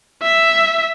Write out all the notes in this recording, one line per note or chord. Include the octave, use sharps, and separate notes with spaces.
E5